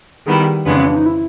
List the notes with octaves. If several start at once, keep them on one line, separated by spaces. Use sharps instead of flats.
D#3 G3 B3 E4 G#4
F2 C#3 E3 G#3 B3 D4
C#4
D4
D#4
E4